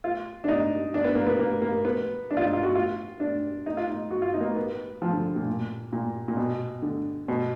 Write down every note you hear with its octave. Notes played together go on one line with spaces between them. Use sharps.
F4
D4
D#4
D4
B3
A#3
B3
A#3
A#3
B3
D4
F4
D#4
F4
F#4
F4
D4
D#4
F4
D#4
F#4
F4
D#4
A#3
B3
B3
F3
D3
A#2
A#2
A#2
A#2
B2
D3
B2